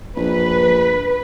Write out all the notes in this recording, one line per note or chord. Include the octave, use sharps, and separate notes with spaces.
A#1 B4